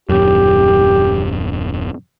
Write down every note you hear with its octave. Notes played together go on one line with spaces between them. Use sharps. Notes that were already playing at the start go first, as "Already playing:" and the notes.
D#1 F#2 G4